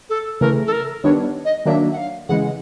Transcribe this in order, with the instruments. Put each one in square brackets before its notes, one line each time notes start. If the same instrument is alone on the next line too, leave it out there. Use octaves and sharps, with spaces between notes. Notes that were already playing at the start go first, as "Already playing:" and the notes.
[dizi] A4
[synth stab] C#3 E3 A3 [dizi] A#4
[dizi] A4
A#4
[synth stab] D#3 G3 B3 D4 [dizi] C#5
[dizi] D#5
[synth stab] D#3 F#3 A#3 D4 [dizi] E5
[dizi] F#5
F5
[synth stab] C#3 E3 G#3 [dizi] F#5